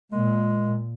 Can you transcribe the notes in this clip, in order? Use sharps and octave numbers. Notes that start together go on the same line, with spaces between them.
A#2 G#3